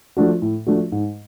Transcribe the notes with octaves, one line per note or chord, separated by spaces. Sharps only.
F3 A3 D4 F#4
A2
F3 A3 D4 F#4
G#2